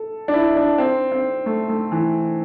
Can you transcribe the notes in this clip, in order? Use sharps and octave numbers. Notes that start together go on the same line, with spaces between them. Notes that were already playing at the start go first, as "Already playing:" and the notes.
Already playing: A4
D4
E4
D4
C4
C4
A3
A3
E3